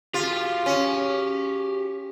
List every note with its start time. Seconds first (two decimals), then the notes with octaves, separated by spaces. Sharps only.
0.14 F4 G4 G#4
0.66 C#4